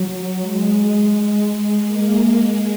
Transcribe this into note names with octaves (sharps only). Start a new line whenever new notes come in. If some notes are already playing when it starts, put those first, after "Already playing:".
Already playing: F#3
G#3
G#3
A#3
G#3